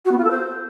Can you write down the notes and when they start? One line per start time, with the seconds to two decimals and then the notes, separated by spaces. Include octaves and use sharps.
0.05 F#4
0.11 B3
0.18 F4
0.24 A4
0.30 C5